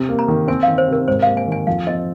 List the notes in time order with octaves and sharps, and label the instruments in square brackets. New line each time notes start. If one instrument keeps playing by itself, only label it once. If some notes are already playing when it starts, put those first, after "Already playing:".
Already playing: [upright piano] C3
A#3
[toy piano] A#5
[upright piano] D#3
[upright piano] C4 [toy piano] G#5
[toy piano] F5
[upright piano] D#3
[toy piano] C5
[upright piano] C3 [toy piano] A#4
[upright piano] G#2 [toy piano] C5
[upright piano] A#3 [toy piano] F5
[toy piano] G#5
[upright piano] D#3 [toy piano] G#5
[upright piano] F2 [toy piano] F5
[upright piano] C4 [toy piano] D#5